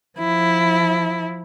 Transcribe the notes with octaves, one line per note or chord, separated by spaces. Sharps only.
F3 E4